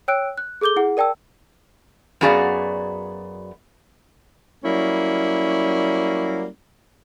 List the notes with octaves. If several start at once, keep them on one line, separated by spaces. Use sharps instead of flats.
C#5 G5 E6 F#6 D7
F#6
G#4 A4 D6 G6 G7
E4 G#4 F#5
A#4 D5 G5 A5 E6
F#2 B3 F#4 G#4 D5 F5
F#3 G3 A#3 C#4 E4